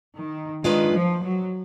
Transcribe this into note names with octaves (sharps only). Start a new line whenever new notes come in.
D#3
D#3 G#3 D4 F4 B4 F5
F3
F#3